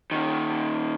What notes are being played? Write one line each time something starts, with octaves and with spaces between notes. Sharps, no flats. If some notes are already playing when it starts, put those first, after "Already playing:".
A#2 D#3